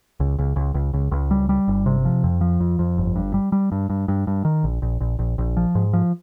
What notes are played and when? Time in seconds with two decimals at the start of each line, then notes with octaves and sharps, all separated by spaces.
0.20 C#2
0.39 C#2
0.56 C#2
0.74 C#2
0.94 C#2
1.11 C#2
1.31 G3
1.49 G3
1.68 G1
1.86 C3
2.05 F3
2.24 F2
2.41 F3
2.60 F2
2.79 F2
2.98 G1
3.16 G2
3.34 G3
3.52 G3
3.72 G2
3.90 G2
4.08 G2
4.27 G2
4.45 D#3
4.64 A#1
4.82 A#1
5.01 A#1
5.19 A#1
5.38 A#1
5.57 F3
5.75 G#2
5.93 F3